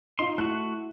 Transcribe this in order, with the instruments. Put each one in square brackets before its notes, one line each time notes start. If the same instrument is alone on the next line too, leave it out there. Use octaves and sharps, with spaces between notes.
[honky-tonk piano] D#4 F4 [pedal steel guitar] C6
[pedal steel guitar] A3 F#4 [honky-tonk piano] E4 F#6